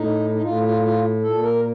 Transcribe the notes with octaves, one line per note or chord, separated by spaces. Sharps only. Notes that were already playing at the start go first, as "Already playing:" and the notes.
Already playing: A2 D#4
D#4
A2 F4
F4
F4
A#2 A4
A#4